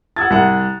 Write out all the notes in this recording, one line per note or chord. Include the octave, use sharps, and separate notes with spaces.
F#5 E6 G#6 A6
C2 F#5